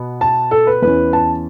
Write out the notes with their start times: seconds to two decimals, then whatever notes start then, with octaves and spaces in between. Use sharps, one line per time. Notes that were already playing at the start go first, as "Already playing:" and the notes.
Already playing: B2 B3
0.21 A5
0.51 A4
0.67 B4
0.82 E2 E3 C#4 B4
1.13 A5